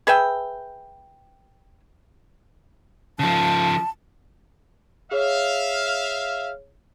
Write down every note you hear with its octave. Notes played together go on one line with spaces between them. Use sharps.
G#4 B4 E5 G5
C#3 F3 A5
G#4 C#5 E5 F5